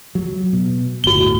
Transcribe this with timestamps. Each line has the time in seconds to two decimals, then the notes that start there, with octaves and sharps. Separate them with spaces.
0.15 F#3
0.53 B2
1.04 G1 D2 A2 F#4 G7